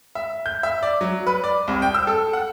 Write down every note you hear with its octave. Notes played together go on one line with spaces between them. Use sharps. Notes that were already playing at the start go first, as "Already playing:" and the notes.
E5
G6
E5
D5
F#3
B4
D5
C2
G5
E6
A4
F#5